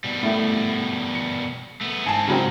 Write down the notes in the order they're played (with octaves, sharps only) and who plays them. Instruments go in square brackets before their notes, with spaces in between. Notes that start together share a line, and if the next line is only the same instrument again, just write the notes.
[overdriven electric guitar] B2 G3
[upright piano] A2 A3
C#7
[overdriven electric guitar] A3 B3
[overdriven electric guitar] G#2 C4 [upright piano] G#5 A5
[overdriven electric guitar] G#2 F#4 [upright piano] C#3 F#3 C4